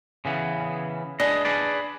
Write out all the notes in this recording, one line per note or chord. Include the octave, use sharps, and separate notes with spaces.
C#3 E3 B3
D4 G#4 B4 D#5
G#4 B4 D5